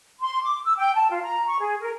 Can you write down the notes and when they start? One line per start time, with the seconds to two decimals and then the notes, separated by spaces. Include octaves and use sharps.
0.19 C6
0.42 D6
0.65 E6
0.78 G5
0.95 A5
1.09 F4
1.22 A#5
1.47 C#6
1.60 G#4
1.81 A#4